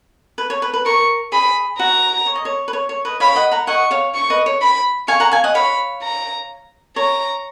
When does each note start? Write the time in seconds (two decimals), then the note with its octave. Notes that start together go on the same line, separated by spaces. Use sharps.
0.38 B4
0.50 C#5
0.62 B4
0.73 B4
0.86 A#4 C#6
1.32 G#4 B5
1.79 F#4 A#5
2.26 C#5
2.36 D#5
2.45 C#5
2.68 B4
2.73 C#5
2.89 C#5
3.05 B4 D#5
3.20 C#5 F5 B5
3.36 D#5 F#5
3.51 F#5 A#5
3.67 D#5 F#5 C#6
3.91 C#5 F5
4.14 C#6
4.30 B4 D#5
4.46 C#5
4.62 B5
5.08 F5 G#5 C#6
5.20 F#5 A#5
5.31 F5 G#5
5.44 D#5 F#5
5.55 C#5 F5 B5
6.03 A#5
6.96 C#5 A#5